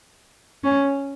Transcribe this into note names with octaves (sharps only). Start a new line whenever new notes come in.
C#4